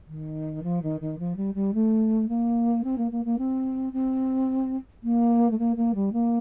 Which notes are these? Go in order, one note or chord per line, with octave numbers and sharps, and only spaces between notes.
D#3
F3
D#3
D#3
F3
G3
G3
A3
A#3
C4
A#3
A#3
A#3
C4
C4
A#3
A3
A#3
A#3
G3
A#3